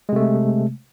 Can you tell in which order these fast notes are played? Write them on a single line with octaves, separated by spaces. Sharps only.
G#3 C3 A3